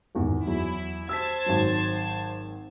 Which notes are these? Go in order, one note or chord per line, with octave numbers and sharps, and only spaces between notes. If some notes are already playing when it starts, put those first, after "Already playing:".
G#1 E2
E2 F#3 E4
C5 A5 E6 G#6 B6
G#1 F#3